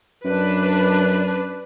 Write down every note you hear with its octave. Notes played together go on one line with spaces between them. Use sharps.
F#2 D4 B4